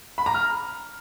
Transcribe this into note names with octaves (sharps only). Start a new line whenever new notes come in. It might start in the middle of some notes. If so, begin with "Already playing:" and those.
B5
A#5
F6